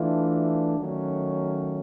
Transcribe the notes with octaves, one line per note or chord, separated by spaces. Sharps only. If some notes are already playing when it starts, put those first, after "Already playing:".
Already playing: E3 A3 D4 F4
D#3 F#3 A3 C#4